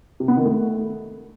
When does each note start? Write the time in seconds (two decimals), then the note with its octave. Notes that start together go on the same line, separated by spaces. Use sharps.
0.20 C3
0.28 B3
0.36 D#3
0.45 A3